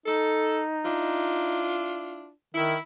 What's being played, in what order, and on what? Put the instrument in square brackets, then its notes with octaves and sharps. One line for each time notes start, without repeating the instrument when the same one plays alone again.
[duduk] D#4 [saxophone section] A4
[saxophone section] D4 E4 F4
[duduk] D#3 [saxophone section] E4